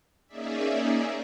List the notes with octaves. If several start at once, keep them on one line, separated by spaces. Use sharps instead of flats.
A#3 C#4 D#4 G#4 D5 E5